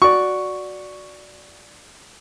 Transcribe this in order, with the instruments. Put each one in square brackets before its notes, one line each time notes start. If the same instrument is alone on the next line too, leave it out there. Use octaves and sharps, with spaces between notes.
[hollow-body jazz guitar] F#4 D5 [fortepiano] C#6